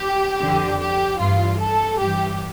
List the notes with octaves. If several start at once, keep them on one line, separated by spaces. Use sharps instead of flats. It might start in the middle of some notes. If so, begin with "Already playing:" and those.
Already playing: G4
F2 D3
G4
G2 E3 F4
A4
G2 E3 G4